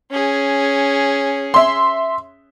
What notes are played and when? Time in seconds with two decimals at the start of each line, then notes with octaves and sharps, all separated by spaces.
0.11 C#4 G#4
1.54 E5 C6